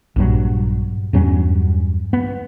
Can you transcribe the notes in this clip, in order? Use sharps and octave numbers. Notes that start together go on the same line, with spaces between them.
A#1 G2 F#3
E2 G2 F#3 C#4
B3